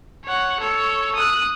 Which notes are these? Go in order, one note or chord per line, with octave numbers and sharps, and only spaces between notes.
C#5 F#5
A4 C#5
D#6 F#6